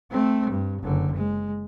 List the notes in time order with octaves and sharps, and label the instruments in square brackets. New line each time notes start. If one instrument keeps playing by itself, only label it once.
[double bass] A3 C4
G2
F#1 D3
G#3